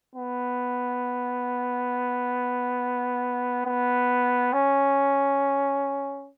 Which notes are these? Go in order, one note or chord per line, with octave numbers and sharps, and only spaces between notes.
B3
B3
C#4